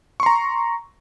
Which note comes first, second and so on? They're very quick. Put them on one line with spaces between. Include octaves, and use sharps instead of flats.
C#6 C6 A#5